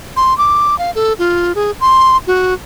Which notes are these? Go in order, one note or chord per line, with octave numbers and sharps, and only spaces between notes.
C6
D6
F5
A4
F4
G#4
C6
F#4